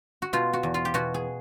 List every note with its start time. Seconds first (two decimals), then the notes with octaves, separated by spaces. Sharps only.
0.22 F#4
0.33 B2 F4
0.53 F#4
0.63 E2
0.74 F4
0.85 G4
0.94 B2 F#4
1.14 G#4